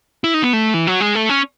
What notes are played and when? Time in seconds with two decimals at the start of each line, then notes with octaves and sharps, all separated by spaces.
0.24 E4
0.34 D#4
0.43 B3
0.53 A3
0.74 E3
0.87 F#3
1.00 G#3
1.15 A3
1.29 C#4